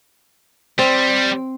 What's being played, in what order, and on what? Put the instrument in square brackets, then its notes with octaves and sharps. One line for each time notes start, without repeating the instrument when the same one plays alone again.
[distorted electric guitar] G3 [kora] C4